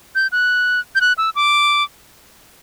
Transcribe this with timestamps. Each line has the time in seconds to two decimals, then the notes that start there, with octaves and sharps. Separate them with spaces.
0.15 G6
0.32 F#6
0.95 G6
1.01 F#6
1.18 E6
1.36 D6